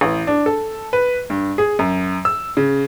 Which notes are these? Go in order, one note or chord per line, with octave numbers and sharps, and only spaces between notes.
A1
D4
A4
B4
G2
G#4
F#2
E6
C#3